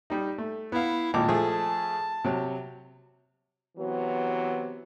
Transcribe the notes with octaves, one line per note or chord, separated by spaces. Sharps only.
G3 D#4
A3
B3 E4 F5
G#1 A#2 A5 D6
F3 A3 G#4
C3 F#3
C3 E3 F#3 B3